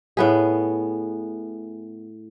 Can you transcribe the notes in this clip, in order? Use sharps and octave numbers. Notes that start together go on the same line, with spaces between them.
A2 B3 G#4